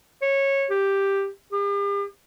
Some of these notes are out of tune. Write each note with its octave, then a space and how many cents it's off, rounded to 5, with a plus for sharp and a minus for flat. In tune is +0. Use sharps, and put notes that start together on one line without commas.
C#5 -15
G4 +5
G4 +45